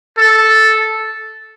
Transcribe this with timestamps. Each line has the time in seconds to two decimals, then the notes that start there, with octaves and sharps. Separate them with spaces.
0.18 A4